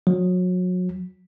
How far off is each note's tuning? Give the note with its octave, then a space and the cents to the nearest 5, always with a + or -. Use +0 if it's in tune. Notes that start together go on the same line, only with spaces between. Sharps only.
F#3 -30